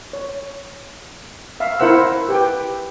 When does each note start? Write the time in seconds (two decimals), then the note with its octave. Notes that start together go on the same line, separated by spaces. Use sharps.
0.13 C#5
1.60 E5 F5
1.79 E4 A#4 C5 F#5 E6
2.29 G4 B4 G5